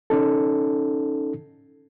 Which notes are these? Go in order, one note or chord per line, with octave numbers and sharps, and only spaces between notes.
C#4 D#4 A4